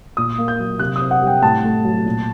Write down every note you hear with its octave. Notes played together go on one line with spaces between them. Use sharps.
A#2 D#6
A#3
G6
F#3
C3 F#6
D#6
C4
F#5
G3 G5
A2 A5
A3
F#3
A#2